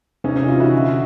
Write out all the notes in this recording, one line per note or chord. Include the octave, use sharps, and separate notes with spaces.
C3 C#4 D#4
C#4 D#4
E3 D#4 F4
E4 F#4
D3